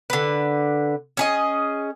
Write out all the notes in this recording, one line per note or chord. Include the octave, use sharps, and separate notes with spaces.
D3 B4
C#4 G#4 D#5